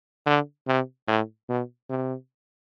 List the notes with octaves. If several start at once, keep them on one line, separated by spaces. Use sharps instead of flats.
D3
C3
A2
B2
C3